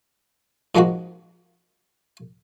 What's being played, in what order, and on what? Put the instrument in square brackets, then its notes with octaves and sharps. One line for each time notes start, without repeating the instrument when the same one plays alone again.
[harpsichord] G#2 F3 G#3 A#3 F#4